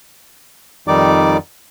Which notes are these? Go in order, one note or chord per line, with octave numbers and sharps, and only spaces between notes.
F2 D#3 G3 D#4 D5 D6